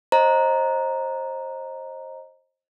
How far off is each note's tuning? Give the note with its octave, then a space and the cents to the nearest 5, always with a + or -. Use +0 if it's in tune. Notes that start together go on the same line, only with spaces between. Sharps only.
C5 +25 D#5 +0 A#5 +0